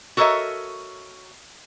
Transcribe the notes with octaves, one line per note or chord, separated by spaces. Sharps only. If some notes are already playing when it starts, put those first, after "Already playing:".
F#4 A4 A#4 C#5 D#5 E5